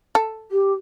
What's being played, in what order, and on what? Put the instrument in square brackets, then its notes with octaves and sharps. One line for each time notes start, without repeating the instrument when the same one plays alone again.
[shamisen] A4
[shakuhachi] G4